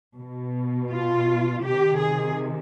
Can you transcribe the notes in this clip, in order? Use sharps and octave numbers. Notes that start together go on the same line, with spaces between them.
B2
F4
C3 D#3 G4
G#4